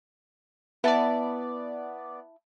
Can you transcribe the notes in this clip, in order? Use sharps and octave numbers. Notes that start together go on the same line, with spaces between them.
B3 E4 D5 A5